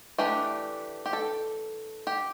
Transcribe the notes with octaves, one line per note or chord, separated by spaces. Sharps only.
E3 A3 D4 G4
G4
A4
G4